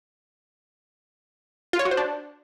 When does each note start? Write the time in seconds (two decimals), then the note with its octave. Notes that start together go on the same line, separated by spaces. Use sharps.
1.73 F4
1.79 C#5
1.85 F#4
1.91 C5
1.97 D4